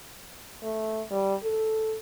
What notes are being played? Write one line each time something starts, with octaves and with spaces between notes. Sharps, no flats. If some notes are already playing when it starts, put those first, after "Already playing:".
A3
G3
A4